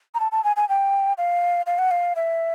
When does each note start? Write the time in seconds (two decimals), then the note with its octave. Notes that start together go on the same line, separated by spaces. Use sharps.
0.15 A#5
0.20 A5
0.32 A5
0.44 G#5
0.56 G#5
0.69 G5
1.18 F5
1.66 F5
1.79 F#5
1.91 F5
2.16 E5